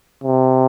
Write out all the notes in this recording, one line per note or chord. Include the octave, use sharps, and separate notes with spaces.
C3